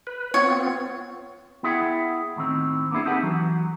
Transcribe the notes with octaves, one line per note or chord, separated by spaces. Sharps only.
B4
B3 C4 F4 C#5
B3 E4 G#4 E5 F#5 G5
A2 D#3 C4
A#3 B3 D4 E4 G#4
C4 D#4 G4 A4 B4 F#5
E3 F#3